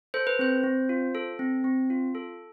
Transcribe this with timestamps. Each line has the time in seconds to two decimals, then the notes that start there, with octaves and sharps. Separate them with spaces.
0.14 A4 C5
0.27 B4
0.39 C4 C5
0.64 C4
0.89 F4
1.15 A4
1.39 C4
1.64 C4
1.90 F4
2.15 A4